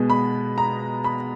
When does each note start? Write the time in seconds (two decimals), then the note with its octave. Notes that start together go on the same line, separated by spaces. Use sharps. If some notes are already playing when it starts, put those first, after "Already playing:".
Already playing: B2 G#3 B3
0.10 B5
0.58 A#5
1.04 B5